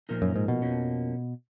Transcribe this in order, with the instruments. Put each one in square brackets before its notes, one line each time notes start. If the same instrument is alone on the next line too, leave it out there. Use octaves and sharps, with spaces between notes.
[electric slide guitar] A#2 F3 A#3 D#4 A#4
[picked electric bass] F#2
G#2
B2
[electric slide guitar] F2 F3 A#3 C#4